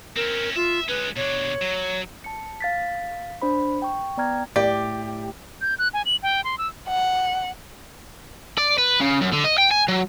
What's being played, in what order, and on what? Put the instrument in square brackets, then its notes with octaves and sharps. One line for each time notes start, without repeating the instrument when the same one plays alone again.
[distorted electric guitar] C4 C#4 [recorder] A#4
[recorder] F4 [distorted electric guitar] E5
[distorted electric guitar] G#3 C#4 [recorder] B4
[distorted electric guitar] B2 D4 [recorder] C#5
[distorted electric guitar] F#3
[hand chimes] A5 C#7
F5 A6 B6
D4 C5 B5
G5 C#6
B3 D5 G5 A#5 F6 G#6
[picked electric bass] A2 [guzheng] G4 [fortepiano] D5
[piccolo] G6
F#6
G#5
F#7
G5
C6
E6
[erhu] F#5
[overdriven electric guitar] D5
B4
C#3
F#2
D3
D#5
G5
G#5
F#3